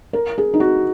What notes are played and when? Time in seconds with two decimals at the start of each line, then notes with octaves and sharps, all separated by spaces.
0.13 A#4
0.38 G#4
0.54 D#4
0.60 F#4